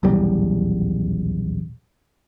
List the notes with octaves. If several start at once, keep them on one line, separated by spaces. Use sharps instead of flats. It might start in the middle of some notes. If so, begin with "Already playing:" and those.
D#1 B1 E2 G3